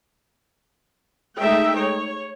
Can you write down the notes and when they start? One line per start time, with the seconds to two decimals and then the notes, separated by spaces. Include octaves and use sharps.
1.39 G#3 A3 D#4 E5 G5
1.77 C#5